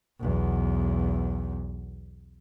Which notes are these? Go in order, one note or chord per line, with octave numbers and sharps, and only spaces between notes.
B1 E2